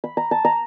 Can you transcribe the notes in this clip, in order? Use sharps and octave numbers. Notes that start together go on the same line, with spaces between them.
B5
A#5
A5
A#5